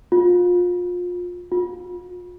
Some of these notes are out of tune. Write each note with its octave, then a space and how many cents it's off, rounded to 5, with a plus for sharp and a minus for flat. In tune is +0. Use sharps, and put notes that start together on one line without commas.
F4 +30
F4 +40